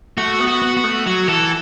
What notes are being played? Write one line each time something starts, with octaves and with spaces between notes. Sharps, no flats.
A3 F#4
B3
F#4
B3
F#4
A3
F#3 F#4
E3 A4